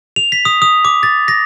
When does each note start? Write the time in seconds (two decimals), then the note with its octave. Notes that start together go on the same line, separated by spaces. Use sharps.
0.16 F7
0.32 B6
0.45 D#6
0.62 D#6
0.85 D6
1.03 A6
1.28 A#6